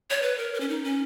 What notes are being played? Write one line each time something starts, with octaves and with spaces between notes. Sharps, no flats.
C#5
B4
A#4
A#4
C#4
D#4
C#4